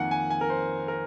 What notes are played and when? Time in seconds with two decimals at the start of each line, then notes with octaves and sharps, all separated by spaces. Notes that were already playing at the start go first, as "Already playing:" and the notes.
Already playing: F2 D#3 A#3 F#5 G#5
0.11 G#5
0.30 G#5
0.41 A#4
0.50 C5
0.88 A#4